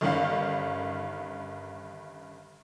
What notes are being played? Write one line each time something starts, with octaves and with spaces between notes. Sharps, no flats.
G1 G2 D#3 C#4 F5